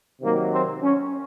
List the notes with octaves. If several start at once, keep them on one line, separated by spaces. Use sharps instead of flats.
C3 D#3 F#3 A#3
C4
C#4